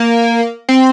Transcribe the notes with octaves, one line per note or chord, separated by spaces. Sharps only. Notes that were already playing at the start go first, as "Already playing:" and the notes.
Already playing: A#3
C4